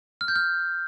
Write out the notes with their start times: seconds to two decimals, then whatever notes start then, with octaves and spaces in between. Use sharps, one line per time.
0.21 F6
0.28 G6
0.36 F6